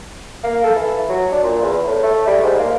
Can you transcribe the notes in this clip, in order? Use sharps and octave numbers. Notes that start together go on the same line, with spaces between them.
A#3
A4
E3
F#3
D4
A#2
E2
A2
A3
G3
G#2
A#3